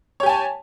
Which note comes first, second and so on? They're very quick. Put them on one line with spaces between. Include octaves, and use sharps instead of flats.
C#5 G4 G#5 A5